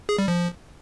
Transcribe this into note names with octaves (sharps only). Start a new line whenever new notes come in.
G#4
G3
F3